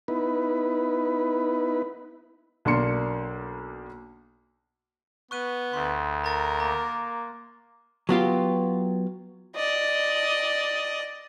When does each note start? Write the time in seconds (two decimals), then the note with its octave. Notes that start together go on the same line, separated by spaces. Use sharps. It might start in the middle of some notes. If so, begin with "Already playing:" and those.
0.08 B3 D#4 E4 B4
2.65 B1 A#3 D4 C6 C#7
5.31 B3 C#6 F#6 D#7
5.73 D2 C6
6.24 A#4 A#5 A6
6.60 A#3 A#5
8.09 F#3 B3 F4 G4
9.55 D5 D#5